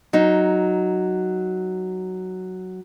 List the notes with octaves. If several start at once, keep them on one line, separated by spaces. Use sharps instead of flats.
F#3 D#4